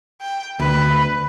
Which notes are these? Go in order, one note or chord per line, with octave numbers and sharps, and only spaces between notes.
G5
D2 B4